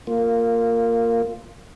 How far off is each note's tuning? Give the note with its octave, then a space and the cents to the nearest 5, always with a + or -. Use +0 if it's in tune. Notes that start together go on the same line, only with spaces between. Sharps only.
A#3 -15 F4 +0